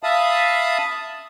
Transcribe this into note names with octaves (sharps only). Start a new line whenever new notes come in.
E5 F5 A5 B5 D#6